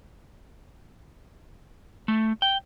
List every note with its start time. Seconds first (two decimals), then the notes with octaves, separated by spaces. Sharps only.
2.08 A3
2.42 G5